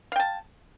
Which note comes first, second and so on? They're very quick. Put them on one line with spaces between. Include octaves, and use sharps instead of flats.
F5 G5 A5